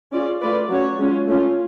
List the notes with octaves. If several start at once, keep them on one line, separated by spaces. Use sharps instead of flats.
C#4 F4 G#4 D5
A3 F4 B4 D5
F#3 C#4 F#4 C#5
G#3 C#4 F4
A3 C#4 F4